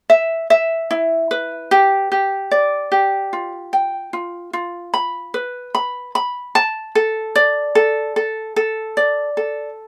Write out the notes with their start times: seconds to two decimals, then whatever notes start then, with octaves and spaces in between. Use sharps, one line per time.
0.10 E5
0.50 E5
0.91 E4
1.31 B4
1.71 G4
2.12 G4
2.51 D5
2.92 G4
3.33 F4
3.73 G5
4.13 F4
4.53 F4
4.94 B5
5.34 B4
5.75 B5
6.15 B5
6.55 A5
6.95 A4
7.35 D5
7.75 A4
8.16 A4
8.56 A4
8.97 D5
9.37 A4